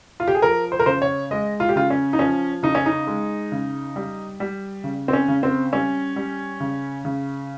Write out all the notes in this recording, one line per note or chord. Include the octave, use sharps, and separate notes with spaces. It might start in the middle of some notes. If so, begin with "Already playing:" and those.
F4
G4
G#4
F3 A#4
C5
A#4
C#3 C5
C#5
G#3 D#5
F4
G4
C#3 F4
C#4
D#4
F3 C#4
C#3 D#4
C#4
D#4
G#3
C#3
G3
G3
C#3
C4
C#4
C#3
C4
G3 C#4
G3
C#3
C#3